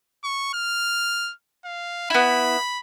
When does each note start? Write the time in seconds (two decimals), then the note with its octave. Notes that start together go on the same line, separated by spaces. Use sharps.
0.24 C#6
0.54 F6
1.65 F5
2.10 B3 E4 B5